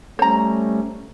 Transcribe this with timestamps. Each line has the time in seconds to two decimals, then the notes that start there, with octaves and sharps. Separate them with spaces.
0.19 G3 A3 C#4 C5 A#5